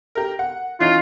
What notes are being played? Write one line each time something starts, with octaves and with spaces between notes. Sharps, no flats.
G4 A#4
F#5
E3 C#4 D#4 F4